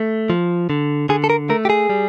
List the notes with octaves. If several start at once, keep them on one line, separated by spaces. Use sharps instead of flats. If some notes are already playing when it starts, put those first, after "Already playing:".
Already playing: A3
F3
D3
D3 G#4
A4
A#4
A3 A#4
G4
G#4
G3